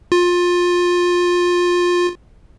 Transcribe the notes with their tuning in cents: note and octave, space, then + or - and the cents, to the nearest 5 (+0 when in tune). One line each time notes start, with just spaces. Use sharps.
F4 +20